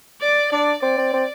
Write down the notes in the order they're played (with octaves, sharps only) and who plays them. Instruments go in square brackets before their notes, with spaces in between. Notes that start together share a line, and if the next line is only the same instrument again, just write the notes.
[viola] D5
[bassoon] D4 [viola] D5
[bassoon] C4 [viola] D5
[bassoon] C4
C4